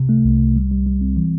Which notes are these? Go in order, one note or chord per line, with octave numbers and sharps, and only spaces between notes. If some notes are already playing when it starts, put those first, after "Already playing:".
Already playing: C3
A3
C2
C2
G3
G3
G3
C4
E3